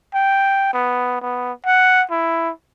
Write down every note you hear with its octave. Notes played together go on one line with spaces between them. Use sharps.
G5
B3
B3
F#5
E4